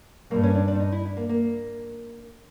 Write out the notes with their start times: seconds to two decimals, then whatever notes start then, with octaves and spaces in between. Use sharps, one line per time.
0.31 G2 A#3
0.43 C#4
0.55 D4
0.68 D4
0.80 D#4
0.92 E4
1.05 D4
1.17 A#3
1.29 A#3